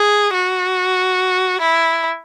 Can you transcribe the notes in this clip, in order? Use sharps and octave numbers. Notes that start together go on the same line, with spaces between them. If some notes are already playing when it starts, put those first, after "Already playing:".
Already playing: G#4
F#4
E4